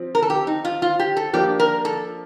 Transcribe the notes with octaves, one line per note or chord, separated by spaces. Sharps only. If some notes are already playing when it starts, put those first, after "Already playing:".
Already playing: F3 C4
A#4
A4
G4
D#4
F4
F4
G4
A4
F3 A#3 D4 G4
A#4
A4